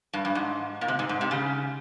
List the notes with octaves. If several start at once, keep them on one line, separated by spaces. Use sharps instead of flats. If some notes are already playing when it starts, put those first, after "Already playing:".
G2
G2
G#2
A#2
C3
G#2
G#2
C3
C#3